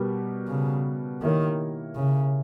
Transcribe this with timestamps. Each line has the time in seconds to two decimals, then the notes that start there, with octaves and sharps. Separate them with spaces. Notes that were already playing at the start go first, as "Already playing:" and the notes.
Already playing: B2 G3 B3 G4 A#4
0.48 C#3
1.22 D#3 A#3 E4 G4 A#4 C#5
1.96 C#3